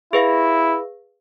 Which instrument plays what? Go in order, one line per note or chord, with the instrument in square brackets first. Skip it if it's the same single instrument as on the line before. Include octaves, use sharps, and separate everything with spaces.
[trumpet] E4 [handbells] G#4 B4 F5